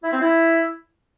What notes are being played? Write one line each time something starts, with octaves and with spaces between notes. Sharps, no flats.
E4
C4
E4